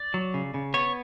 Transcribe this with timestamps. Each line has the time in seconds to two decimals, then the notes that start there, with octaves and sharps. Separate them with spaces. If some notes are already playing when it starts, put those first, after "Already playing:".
Already playing: D5
0.14 F#3
0.34 C#3
0.54 C#3
0.74 B3 C#5